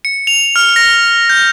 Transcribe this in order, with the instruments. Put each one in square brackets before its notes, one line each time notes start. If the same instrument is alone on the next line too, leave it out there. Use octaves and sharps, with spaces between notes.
[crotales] C#7
F7
F6
A#6
G6